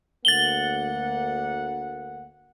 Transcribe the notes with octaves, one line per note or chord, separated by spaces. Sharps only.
D2 A#3 F#5 A6 F#7 G7